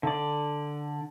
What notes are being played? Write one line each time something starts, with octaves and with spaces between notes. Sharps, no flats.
D3 D5